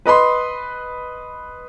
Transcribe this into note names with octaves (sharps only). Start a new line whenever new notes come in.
B4 D#5 B5 C6